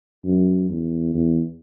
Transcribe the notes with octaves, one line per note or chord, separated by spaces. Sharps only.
F#2
E2
E2